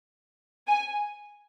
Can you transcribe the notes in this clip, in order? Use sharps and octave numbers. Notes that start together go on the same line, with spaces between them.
G#5